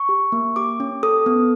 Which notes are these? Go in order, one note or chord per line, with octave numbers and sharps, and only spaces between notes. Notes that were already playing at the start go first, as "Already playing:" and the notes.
Already playing: C#6
G4
A#3
G4 D6
C#4
A4 D#6
B3